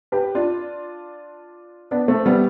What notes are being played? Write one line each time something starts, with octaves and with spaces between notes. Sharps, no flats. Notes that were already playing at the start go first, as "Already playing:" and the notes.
G4 B4
D4 F4
B3 D4
A3 C4
G3 B3